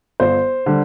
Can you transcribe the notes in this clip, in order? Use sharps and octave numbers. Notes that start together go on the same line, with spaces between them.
G1 C5
D3 G3